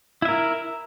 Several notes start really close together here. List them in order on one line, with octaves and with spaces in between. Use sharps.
E4 E5 A#4